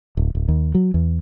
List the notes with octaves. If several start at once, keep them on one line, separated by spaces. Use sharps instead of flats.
D1
D1
D#2
F#3
E2